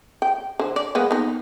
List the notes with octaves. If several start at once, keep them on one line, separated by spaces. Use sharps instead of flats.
G5
D3 C5
D5
G#3 A#3 B3
B3 D#4